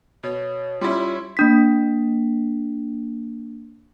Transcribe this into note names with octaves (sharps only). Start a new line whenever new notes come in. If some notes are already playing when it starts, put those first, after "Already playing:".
B2 C#5
G3 C#4 E4 F4
A#3 D4 B6